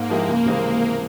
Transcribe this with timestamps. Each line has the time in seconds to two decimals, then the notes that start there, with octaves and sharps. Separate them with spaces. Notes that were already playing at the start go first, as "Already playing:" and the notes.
Already playing: G#2 A#3
0.10 F3 G#3 E4 G4
0.28 C#2
0.45 C3 E3 G#3 C4